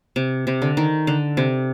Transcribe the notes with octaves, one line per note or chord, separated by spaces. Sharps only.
C3
C3
D3
D#3
D3
C3